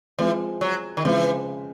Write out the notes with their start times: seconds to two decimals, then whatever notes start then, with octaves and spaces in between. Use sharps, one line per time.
0.18 E3 F3 G#3 C4 F4
0.61 F#3
0.97 D#3
1.04 C#3 E3 F3 G#3 C4